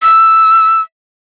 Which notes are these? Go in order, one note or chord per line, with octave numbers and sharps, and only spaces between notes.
E6